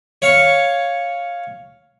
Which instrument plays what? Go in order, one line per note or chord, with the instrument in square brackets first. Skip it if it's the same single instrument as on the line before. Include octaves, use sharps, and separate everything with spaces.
[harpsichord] C#5 F5 C#6